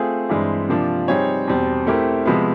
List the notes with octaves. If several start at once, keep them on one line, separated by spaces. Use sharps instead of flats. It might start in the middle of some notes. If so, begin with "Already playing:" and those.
Already playing: A3 C4 F4 G#4
G2 E3 G#3 C4
C3 F3 A#3 D4 F4
G3 C4 D#4 G#4 C#5
E2 B2 G3 C4
A3 C4 E4 G4 A#4
C3 F3 G#3 B3